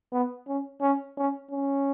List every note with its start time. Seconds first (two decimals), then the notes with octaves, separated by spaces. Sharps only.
0.12 B3
0.47 C#4
0.81 C#4
1.17 C#4
1.51 C#4